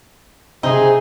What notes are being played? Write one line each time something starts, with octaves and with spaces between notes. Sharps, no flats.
C3 C4 D#4 G#4